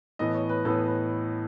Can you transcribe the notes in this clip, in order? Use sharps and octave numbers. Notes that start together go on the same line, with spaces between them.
A2 E3 B3 D#5
C#5
B4
A2 E3 B3 A4
B4